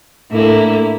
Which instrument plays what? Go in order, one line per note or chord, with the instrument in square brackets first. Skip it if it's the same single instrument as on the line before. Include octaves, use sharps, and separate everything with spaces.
[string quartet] A2 D3 A#3 E4